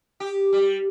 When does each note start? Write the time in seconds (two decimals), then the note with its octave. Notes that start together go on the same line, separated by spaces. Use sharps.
0.20 G4
0.53 G3